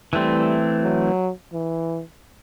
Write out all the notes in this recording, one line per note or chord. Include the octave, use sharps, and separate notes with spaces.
E3 G3 A3 C4
F#3
E3